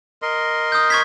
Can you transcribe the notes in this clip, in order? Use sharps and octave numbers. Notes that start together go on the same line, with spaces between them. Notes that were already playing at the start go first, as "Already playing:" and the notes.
A#4 D#5 C6
D#6 G6
C#6 G#6 B6